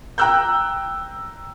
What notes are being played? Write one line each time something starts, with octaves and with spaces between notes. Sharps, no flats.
G5 A#5 E6 F#6 G6